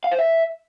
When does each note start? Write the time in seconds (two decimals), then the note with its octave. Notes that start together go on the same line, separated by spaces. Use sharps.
0.04 F5
0.11 C5
0.19 E5